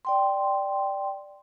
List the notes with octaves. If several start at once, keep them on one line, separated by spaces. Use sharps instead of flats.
D5 G5 C6